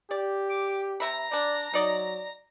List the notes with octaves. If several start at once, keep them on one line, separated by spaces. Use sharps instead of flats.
G4 D5
D6
C3 E5 A#5 B5
G3 D4 D5
F#3 D#4 D5 D#5